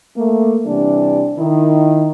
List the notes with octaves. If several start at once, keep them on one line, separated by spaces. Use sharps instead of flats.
A3 A#3
C3 E3 G3 D4
D#3 E4